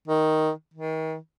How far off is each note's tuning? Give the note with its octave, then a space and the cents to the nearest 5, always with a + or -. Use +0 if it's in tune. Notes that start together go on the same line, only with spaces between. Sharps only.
D#3 +5
D#3 +35